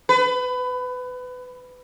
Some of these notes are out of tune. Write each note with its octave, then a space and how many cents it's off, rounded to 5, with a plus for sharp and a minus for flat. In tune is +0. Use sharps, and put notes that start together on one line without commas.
B4 +25